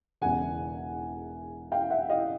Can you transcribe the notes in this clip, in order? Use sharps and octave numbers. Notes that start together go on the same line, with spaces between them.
E1 E2 C#3 F#5 G#5
F5 G5
E5 F#5
D#5 F5